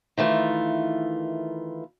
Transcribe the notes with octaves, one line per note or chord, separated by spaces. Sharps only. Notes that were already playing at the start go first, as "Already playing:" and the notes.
D#3 E3 A3 F4